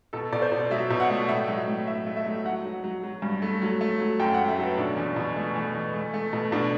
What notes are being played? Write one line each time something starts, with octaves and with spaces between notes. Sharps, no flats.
B2 A4
B2 D5
C5
B2
F#3 E5
B2
F#5
A3
A2 E5
F#3
A2
A2 E5
A3
E5
F#3
F#3 F#5
F#3
F#3
F#3
G2
A3
F#3
A3
F#3
F#2 G5
A3 F#5
E5
F#3 A4
B4
B2 D4
E2
B2
A3
E2
E2
A3
A3
B2
B2 D4